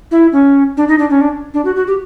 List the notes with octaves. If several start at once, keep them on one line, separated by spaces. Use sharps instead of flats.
E4
C#4
D4
D#4
D4
C#4
D4
D4
F#4
F#4
G4